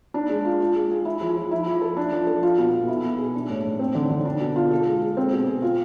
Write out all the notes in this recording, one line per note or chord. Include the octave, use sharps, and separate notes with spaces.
D4
G#3
F4
F4
G#3
G#4
E4
F3
F3
E4
F3
A4
D4
F3
A4
F4
B2
B2
E4
B2
G#4
D4
A2
A2
C4
D3
D3
D4
B2
F4
A4
G#3
G#3
C4
B2
G#4
F4